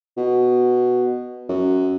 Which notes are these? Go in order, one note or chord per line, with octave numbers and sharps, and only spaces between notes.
B2
F#2